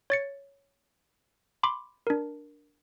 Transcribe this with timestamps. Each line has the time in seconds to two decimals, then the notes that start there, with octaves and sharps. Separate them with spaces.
0.10 C#5 A6 C#7
1.63 B5 C6 D6
2.07 D4 A#4